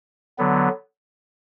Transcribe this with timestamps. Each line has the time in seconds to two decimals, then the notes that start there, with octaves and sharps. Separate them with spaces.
0.38 D3 F#3 B3